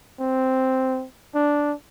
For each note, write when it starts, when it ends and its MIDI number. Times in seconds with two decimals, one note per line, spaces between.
0.20 1.05 60
1.35 1.74 62